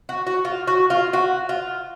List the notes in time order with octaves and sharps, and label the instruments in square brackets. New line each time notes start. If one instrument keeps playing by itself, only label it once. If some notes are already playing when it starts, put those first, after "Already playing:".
[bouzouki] F#4
F#4
F4
F#4
F4
F#4
F4